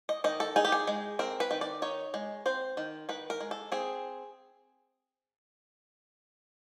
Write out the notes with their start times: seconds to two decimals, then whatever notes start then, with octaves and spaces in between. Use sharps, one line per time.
0.09 D#5
0.24 D#3 D#5
0.40 A4
0.56 D#4 G#4
0.65 G4
0.72 G#4
0.87 G#3
1.19 C4 A#4
1.40 B4
1.51 D#3
1.61 D5
1.82 D#4 C#5
2.14 G#3
2.46 C4 C5
2.77 D#3
3.09 D#3 B4
3.30 A#4
3.40 G#3
3.51 A4
3.72 C4 G#4